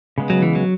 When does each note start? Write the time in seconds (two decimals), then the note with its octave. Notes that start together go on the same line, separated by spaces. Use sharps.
0.18 C#3 G#3 B3
0.30 F#3
0.42 E3
0.55 F#3